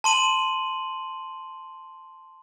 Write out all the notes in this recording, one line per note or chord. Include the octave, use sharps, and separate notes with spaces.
A5 C6 D#7 F#7